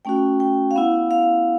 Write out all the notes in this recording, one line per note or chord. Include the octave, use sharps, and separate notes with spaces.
A3 C#4 F#4 G5
G5
F5
B3 E4 F#5
F5